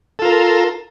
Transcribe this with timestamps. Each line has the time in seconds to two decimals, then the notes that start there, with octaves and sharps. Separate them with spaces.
0.19 A4
0.22 F4
0.25 A#4